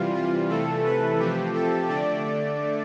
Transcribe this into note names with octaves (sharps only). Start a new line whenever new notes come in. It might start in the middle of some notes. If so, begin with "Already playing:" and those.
Already playing: C3 E3 G3 F4
F4
C3 E3 A3 A4
B4
C3 F3 A3 G4
A4
D3 A3 D5